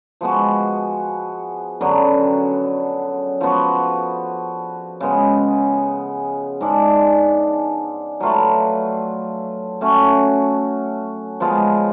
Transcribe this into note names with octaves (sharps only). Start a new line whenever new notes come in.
F3 G#3 B3 F#4
F#2 D3 F#3 B3
F3 B3 F#4
C#3 G#3 B3
G#2 G#3 D4
F#3 A3 F4 B4
A3 C#4 F#4
F3 G#3 B3 F4